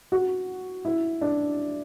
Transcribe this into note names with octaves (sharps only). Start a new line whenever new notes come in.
F#4
E4
D4